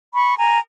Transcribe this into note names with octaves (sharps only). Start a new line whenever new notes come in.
B5 C#6
G#5 A#5